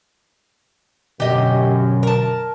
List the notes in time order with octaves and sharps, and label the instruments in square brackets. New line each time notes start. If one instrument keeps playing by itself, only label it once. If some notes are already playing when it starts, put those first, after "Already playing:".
[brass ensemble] F#2 [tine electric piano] B2 D3 [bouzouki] G4 D#5
[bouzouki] A#4 A5